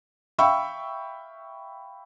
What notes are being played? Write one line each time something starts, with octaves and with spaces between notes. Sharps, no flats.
E5 F5 G5 B5 C#6 E6